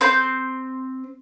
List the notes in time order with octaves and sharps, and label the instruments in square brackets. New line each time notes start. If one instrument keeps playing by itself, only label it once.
[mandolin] C4 C5 G6